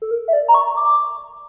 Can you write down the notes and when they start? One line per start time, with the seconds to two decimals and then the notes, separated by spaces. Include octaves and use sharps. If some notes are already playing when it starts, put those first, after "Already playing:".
0.02 A4
0.11 A#4
0.28 E5
0.33 D5
0.48 A#5
0.54 C#6
0.76 D6